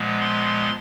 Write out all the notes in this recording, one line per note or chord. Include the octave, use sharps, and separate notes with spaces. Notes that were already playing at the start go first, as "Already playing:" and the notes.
Already playing: A#2 F3 G#3 B3
C6